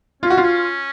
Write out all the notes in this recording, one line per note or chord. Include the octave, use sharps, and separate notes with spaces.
C#4 F4
F#4
C#4 F4